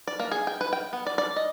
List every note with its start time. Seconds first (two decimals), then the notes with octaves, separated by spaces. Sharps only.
0.07 D5
0.20 A#3
0.31 G#4
0.47 G5
0.61 B4
0.73 G5
0.93 B3
1.07 D5
1.18 D5
1.36 D#5